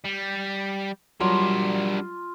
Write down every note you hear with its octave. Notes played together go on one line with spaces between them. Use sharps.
G3
F#3 G3 D4 F4 A#4